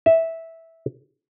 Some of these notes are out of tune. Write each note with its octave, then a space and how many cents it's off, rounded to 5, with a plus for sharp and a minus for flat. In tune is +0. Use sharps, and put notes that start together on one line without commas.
E5 -10